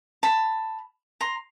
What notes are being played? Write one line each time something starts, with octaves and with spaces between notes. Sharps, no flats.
A5 B5
A#5 C6